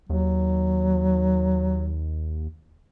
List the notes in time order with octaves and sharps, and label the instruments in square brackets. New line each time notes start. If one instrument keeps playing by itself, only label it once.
[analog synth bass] D#2 [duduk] F#3